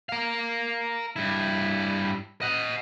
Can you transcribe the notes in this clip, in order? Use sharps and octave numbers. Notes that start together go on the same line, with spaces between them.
A#4 F5
G2 E4
D#5 F#5